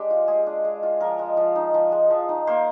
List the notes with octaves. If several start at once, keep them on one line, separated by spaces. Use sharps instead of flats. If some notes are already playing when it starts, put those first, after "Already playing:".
Already playing: G#3 D4 G4
F4
G#3 G#4
D4
G#3
F4
F3 A#4
G#3
F3
D#4
F3
G#3
F3
D#4
A#3 C5